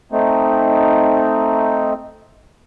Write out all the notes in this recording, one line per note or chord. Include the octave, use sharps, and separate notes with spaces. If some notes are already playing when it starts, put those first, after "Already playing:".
A3 C4 D#4